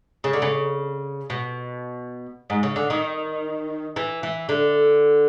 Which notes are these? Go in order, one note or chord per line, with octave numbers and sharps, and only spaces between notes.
C#3
D3
C#3
B2
G#2
C#3
D3
D#3
E3
E3
D3